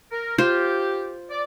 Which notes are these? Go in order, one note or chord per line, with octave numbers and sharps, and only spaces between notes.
A#4
F4 G4 C5
D5